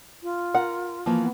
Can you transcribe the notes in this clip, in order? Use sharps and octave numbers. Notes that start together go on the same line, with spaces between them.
F4
A#4 F#5
E3 F3 A#3 F4
B3